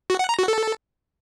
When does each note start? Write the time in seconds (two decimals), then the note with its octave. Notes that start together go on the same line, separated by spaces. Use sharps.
0.10 F#4
0.19 F#5
0.29 A#5
0.39 F#4
0.48 A4